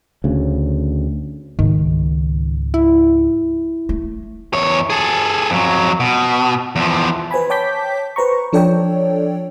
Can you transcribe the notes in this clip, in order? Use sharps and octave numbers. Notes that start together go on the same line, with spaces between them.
D2 C#3
C#2 G#2 D#3
E4
A3
E2 C#5
G#4 A4
F2 F#3
B2
E2 F3
B4 C5 G#5 B5
C#5 G5 A5 D6 G6 B6
B4 C5 A#5 C#6
F3 D4 A4 C#5 D5 G5